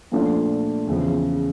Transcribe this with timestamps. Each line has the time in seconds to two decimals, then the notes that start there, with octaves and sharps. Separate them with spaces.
0.12 A#2 F3 A3 D4 F4
0.87 E2 C#3 F3